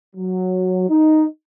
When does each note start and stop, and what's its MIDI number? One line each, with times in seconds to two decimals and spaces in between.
0.15 0.86 54
0.89 1.25 63